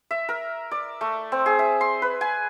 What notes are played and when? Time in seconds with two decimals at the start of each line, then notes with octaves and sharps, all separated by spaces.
0.11 E5
0.29 A#4
0.71 D5
1.01 A3
1.32 C4
1.46 G#4
1.59 E5
1.81 C6
2.02 B4
2.21 G#5